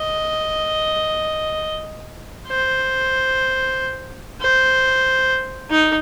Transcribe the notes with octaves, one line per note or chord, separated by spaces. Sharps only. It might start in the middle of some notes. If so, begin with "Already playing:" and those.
Already playing: D#5
C5
C5
D#4